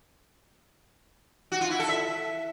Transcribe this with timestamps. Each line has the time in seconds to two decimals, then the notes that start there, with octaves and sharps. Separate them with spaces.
1.52 F#4
1.61 F4
1.70 E4
1.80 A4
1.89 E5